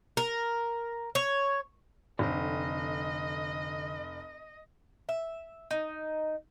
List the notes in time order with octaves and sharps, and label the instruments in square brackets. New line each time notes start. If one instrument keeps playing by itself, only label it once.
[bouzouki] A#4
C#5
[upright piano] F1 [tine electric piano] D3 C4 [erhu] D#5
[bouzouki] E5
D#4